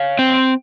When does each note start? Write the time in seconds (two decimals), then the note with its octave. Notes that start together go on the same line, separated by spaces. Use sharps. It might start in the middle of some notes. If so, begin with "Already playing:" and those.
Already playing: C#5 F5
0.19 C4